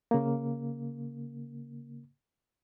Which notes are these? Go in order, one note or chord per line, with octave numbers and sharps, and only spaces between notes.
C#3 A#3